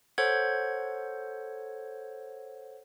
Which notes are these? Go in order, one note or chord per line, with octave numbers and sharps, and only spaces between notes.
A4 C5 C#5 F#5 G#6